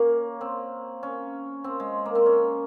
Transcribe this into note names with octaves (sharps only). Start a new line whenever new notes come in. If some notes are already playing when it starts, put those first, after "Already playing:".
Already playing: A#3 C#4
C4
C#4
C4
G#3
A#3
C4
C#4